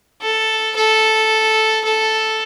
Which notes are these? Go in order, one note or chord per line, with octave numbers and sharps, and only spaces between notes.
A4
A4
A4